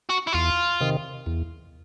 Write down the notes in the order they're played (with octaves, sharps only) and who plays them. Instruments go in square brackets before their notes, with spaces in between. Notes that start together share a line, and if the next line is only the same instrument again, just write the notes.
[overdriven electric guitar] F#4
E4
[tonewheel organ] E2 [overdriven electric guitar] F4
[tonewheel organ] C3 D#3
E2